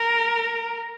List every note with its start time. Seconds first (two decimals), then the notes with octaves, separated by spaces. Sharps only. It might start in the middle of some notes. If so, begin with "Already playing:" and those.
Already playing: A#4